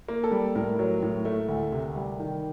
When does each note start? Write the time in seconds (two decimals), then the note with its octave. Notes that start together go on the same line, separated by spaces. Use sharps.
0.08 A#3
0.24 A4
0.31 G3
0.55 A2 A#4
0.79 F#3
1.02 A2
1.25 A3
1.48 D2
1.72 C3
1.96 G3
2.20 D#3